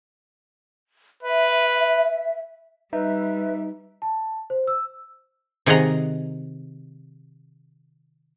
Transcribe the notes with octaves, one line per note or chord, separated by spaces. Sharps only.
B4 E5
G3 D#4 B4 E5
A5
C5
E6
C3 D#3 G#4 D#5 F#5 A#5